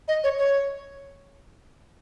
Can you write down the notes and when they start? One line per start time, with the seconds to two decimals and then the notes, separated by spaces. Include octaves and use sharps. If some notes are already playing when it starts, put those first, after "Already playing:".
0.08 D#5
0.24 C#5
0.39 C#5